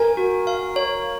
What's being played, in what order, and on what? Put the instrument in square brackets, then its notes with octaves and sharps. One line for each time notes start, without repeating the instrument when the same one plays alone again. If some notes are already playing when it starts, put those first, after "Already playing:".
Already playing: [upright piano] A#4 [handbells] G#5
[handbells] F#4
F5
C#5